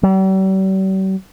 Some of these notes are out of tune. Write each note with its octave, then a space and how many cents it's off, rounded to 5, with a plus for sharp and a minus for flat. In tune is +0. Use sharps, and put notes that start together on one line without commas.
G3 -45